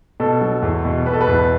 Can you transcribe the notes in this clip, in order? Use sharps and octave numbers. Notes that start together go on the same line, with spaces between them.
B2 A4
F#3
E2
B2
B2 B4
A4
B4
E2